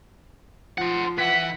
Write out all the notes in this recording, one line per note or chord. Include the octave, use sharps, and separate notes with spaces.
F3 C5 F#5
E3 F#5 B6